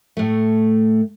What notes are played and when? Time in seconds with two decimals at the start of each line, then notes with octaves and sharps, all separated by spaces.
0.17 A2 A3